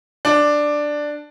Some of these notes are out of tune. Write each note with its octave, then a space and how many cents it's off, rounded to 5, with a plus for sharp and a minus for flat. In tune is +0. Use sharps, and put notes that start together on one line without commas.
D4 +5